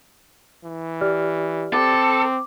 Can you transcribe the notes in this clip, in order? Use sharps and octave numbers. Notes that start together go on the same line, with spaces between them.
E3
G4 D5 F6
C4 A4 D6